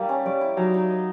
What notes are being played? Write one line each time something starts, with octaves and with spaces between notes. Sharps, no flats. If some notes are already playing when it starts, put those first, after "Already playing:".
Already playing: G3 A#3 D#4 G4
C#4
G3 D5
E4
F#3 D#4
D#4
D#5